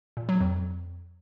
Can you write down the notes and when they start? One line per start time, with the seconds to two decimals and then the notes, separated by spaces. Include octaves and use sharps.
0.17 A#2
0.29 F#3
0.40 F2